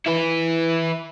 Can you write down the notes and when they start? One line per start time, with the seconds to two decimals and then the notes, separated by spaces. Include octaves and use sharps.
0.06 E4 B4